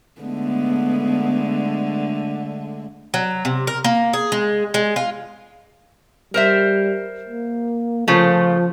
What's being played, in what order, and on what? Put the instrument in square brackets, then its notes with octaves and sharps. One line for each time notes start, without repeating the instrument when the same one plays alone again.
[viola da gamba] D3 G#3 A3 [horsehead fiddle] B3
[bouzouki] F#3
C3
A#4
A#3
G#4
G#3
G#3
F4
[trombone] G3 [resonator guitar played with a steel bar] A#4 C5 E5
[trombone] A#3
[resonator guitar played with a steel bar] C#3 A3 [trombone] F3